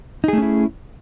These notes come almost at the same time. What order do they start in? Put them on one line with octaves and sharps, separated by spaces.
D#4 G#4 A3 C#4 E4